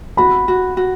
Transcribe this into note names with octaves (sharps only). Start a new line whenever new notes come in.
F#4 B5
F#4
F#4